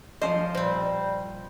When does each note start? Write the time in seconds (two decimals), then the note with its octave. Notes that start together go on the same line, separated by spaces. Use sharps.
0.22 F3 C#4 C5 D#5
0.55 A#2 G3 C4 C5